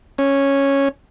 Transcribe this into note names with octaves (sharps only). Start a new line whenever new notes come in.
C#4